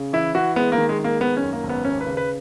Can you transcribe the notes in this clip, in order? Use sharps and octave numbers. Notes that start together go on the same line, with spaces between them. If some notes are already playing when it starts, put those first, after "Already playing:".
Already playing: C#3
E3 E4
E3 F#4
G#3 B3
A#3
D#3
G#3
G#3
A#3
D#3 B3
C#4
F#2
A#3
G#1
B3
D#2 C#4
B4
C#3
B4